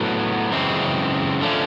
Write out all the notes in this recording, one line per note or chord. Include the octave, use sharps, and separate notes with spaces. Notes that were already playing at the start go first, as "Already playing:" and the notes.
Already playing: A2 F#3 B3
F#2 C#3 E3 G#3 C4
D3 F3 A3 C#4